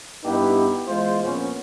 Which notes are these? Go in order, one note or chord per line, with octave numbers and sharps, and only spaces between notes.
G2 B3 D#4 E4 G4 B4
E2 G#3 F4 C5
A#1 A#2 B3 C#4